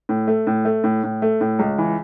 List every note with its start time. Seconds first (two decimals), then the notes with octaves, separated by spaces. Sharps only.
0.09 A2
0.27 A3
0.47 A2
0.65 A3
0.84 A2
1.04 A2
1.22 A3
1.41 A2
1.59 C#2
1.78 E3